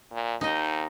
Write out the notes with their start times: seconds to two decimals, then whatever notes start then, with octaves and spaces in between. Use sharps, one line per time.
0.13 A#2
0.41 D#2 D#4 D#5